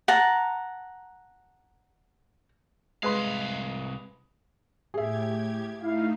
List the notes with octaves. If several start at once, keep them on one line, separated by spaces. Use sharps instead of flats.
F#5 A5 A#5
C2 G#3 B4 F5 C6
A2 G4 G#4 E5 G#6
A3 D#4 E4 F5